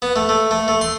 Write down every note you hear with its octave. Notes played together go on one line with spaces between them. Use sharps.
B3
A3
A3
A3
A3
C6